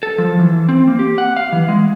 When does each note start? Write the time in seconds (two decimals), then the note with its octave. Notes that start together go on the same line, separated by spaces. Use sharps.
0.03 A4
0.18 F3
0.39 E3
0.69 C4
0.88 A#3
0.99 G4
1.18 F#5
1.37 F5
1.52 E3
1.68 G#3